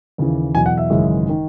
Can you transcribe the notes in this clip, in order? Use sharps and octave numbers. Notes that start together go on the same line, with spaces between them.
D#2 C#3 E3
E2 B2 F#3 G#5
F#5
E5
G#1 F#2 C#3 E3 G#3
D#3